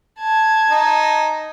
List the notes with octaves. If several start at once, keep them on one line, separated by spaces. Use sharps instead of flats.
A5 G#6
D#4